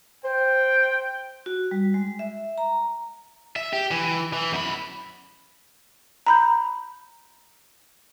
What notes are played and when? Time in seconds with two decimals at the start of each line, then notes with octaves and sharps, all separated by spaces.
0.25 C5 G5
1.46 F#4
1.71 G3
1.94 G#3
2.19 E5
2.58 A#5
3.56 E5
3.73 G4
3.91 E3
4.33 E3
4.53 F#2 B5
6.26 A#5 B5 G6